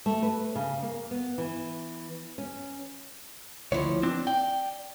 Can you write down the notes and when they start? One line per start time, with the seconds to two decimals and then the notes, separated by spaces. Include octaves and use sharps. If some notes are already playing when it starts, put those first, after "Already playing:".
0.06 A3
0.23 B4
0.55 C#3
0.82 A#3
1.11 B3
1.38 E3
2.38 C#4
3.72 D2 E3 F3 C#5
4.03 C4 D4
4.27 D5 G5